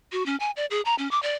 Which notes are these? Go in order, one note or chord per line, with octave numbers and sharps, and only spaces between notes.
F#4
C#4
G#5
D5
G#4
A#5
C#4
D6
D5